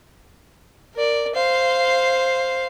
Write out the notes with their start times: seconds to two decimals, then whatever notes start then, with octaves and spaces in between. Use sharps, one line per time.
0.94 A#4 D5
1.34 C5 F5